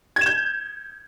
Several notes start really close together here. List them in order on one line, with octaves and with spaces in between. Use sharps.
G#6 E7 G6